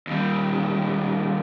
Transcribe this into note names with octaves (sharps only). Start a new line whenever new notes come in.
D#2 G3